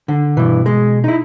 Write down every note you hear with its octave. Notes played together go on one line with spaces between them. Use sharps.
D3
G2 B2 E3
G#3
D#4 E4